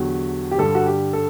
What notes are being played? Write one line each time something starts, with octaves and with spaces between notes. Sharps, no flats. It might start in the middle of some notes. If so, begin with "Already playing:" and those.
Already playing: E2 D3 F#3 G4
G4
G2 D3 G3 A4
F#4
G4
A4